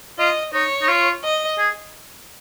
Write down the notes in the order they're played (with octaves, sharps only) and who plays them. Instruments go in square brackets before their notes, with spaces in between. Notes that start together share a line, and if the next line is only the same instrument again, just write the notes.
[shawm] F4 [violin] D#5
[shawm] D#4 [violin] C#5
[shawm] D#4
F4
[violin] D#5
[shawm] G#4